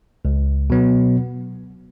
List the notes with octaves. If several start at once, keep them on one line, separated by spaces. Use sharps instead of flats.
C#2
B2 F#3 B3